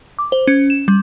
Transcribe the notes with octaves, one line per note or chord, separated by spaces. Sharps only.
D6
C5
C#4
E7
G3